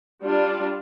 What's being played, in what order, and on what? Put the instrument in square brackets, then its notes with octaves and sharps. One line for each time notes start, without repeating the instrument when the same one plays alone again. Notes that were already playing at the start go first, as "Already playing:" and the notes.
[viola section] G3 D4 F4